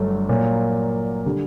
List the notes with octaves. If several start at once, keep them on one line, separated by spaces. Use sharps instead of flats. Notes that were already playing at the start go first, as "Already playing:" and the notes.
Already playing: G1 G2 F#3 A3
A#2 F#3 A#3
D3 G3